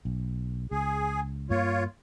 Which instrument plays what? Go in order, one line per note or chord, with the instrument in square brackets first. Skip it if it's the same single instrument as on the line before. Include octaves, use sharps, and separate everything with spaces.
[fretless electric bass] B1
[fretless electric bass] C#2 [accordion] G#4
[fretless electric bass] G2 A#3 [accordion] F4 C#5